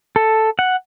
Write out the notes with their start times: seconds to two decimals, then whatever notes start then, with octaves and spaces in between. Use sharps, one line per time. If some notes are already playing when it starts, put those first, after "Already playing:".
0.16 A4
0.59 F#5